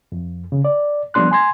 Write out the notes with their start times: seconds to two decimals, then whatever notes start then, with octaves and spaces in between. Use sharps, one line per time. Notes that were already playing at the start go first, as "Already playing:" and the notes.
0.12 F2
0.52 C#3
0.65 D5
1.14 F3 G3 B3 D4 C6 F#6
1.31 G#5 C6 G#6